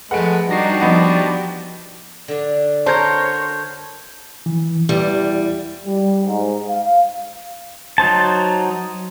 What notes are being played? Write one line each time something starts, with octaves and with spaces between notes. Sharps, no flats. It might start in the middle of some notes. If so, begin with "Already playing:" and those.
F3 G#3 A3 B4 F#5 D7
G3 D4 D#4 F#4 G4 A#6 C7
F3 B3 D#4
D3 D4
F#4 A#4 C5 C#5 A5 C6 G6 G#6
E3
E2 G3 G4
G3
G#2
F5
F#3 D#4 C5 A5